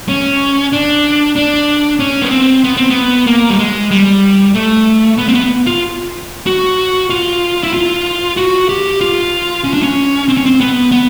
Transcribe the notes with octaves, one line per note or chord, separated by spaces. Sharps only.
C#4
D4
D4
C#4
B3
C4
B3
C4
B3
A#3
G3
G#3
G3
A3
B3
C4
B3
F4
F#4
F4
E4
F4
F#4
G4
F4
C#4
D4
C#4
C4
C#4
C4
B3
B3